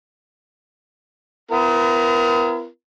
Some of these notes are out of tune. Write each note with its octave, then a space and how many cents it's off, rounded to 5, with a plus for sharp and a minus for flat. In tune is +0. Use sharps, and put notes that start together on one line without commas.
B3 +40 E4 +45 A#4 +15